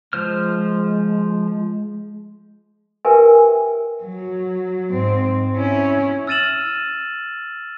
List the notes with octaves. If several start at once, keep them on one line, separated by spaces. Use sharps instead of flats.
F3 G#3 C5 F6
G4 A#4 B4 E5 G5 G#5
F#3
G#2 C4
C#4 E4
E6 F6 A6 D#7 E7 F#7